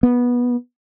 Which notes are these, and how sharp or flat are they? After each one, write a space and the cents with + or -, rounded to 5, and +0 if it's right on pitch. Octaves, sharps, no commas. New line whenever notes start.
B3 -15